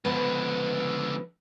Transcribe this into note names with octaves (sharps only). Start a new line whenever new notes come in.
C#2 D3 F3 B3 B4